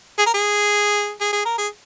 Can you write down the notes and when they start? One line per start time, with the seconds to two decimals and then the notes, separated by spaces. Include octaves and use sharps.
0.18 G#4
0.26 A#4
0.34 G#4
1.20 G#4
1.33 G#4
1.45 A#4
1.58 G#4